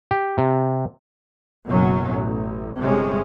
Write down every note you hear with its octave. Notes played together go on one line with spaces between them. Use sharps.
G4
C3
F#1 F#2 B2 F#3 C#4
A1
G1 C3 G#3 C#4